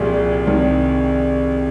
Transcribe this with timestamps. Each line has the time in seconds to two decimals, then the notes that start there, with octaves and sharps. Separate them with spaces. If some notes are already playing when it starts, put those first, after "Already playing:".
Already playing: C2 A#2 F3 G4 G#4
0.46 C2 C3 D#3